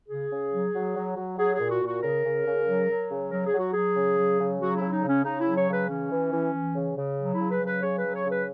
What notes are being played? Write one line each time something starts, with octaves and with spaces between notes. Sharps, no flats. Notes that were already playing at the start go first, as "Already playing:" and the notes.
C#3 G#4
C#3
F#3
F#3
F#3
F#3
F#3 G#4
G#4
A#2
F#4
A#2 F#4
C#3 A#4
C#3
C#3
F#3
F#3
C#3
F#3 A#4
G#4
F#3
F#4
F#3 G#4
C#3
F#3
C#3
F#3 F#4
E4
C#3
D#4
C#3
C#4
C#3 D#4
E4
F#3
C#5
C#3 B4
E3 C#4
E3
E3
E3
C#3
C#3
F#3
E4
C#3
B4
F#3
B4
C#3 C#5
B4
F#3
C#5
C#3
B4